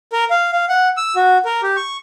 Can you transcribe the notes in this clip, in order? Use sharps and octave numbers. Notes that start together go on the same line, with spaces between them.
A#4
F5
F5
F#5
E6
F#4
A#4
G4
C#6